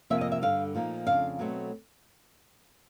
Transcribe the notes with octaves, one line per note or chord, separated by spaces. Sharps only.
F2 C3 F3 A#3 E5
D#5
E5
G2 D3 G3 F5
A#2 F3 A#3 D#4
F2 C#3 D4 F5
B2 F#3 A3 C4